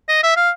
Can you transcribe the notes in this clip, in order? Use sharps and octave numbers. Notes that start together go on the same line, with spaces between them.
D#5
E5
F5